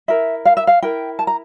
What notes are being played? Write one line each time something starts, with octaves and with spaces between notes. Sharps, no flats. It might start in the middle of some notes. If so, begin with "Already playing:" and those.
E4 A#4 E5
F5
E5
F5
E4 A#4 G5
A5
A#5